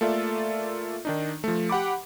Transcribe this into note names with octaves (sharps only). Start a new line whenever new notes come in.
A3 A#3 F4 A4 D5 E5
D#3 D4 D#4
F3 A3
G4 F#5 B5 D6